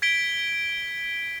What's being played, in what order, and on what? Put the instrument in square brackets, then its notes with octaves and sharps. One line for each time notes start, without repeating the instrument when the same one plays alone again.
[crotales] G#6 B6 D7 G7